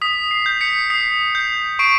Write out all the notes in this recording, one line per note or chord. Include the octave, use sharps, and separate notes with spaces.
D#6 B6
C7
G6
B6 C#7
D#6 C7
G6
C#6 C7 D7